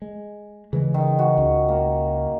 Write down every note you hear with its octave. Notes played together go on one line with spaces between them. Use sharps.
G#3
C#3 E3 G#3
D#3
F#4
C#2
A#3